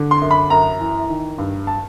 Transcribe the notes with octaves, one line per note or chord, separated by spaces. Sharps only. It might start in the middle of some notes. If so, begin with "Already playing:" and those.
Already playing: D3
C6
F#2
B5
F#2 A#5
E3
D#3
G2
A5